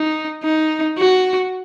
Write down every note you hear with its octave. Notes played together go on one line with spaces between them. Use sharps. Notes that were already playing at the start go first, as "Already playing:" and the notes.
Already playing: D#4
D#4
F#4